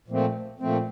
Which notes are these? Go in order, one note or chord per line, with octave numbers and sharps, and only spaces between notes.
A#2 F3 A3 C4
A#2 F3 A3 C4